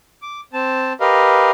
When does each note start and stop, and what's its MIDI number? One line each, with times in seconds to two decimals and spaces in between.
0.22 0.41 86
0.53 0.93 60
0.53 0.93 81
1.01 1.51 67
1.01 1.51 70
1.01 1.51 71
1.01 1.51 75
1.01 1.51 77